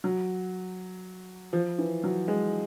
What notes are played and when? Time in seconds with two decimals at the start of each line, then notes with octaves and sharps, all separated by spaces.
0.04 F#3
1.53 F3
1.79 E3
2.04 F#3
2.28 G#3